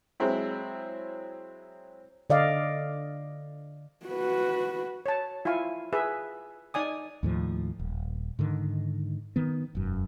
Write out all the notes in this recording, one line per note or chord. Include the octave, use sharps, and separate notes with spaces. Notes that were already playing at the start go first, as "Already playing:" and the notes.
F#3 G#3 C4 E4
D3 D5 D#5 F5
F#4 B4
C#5 A5
E4 F4 F5 G#5 C#6
G#4 B4 E5
D#4 D5 G#5 D#6
D#2 A2 F3
D#1
G#2 D3 D#3
D#3 B3
E1 F#2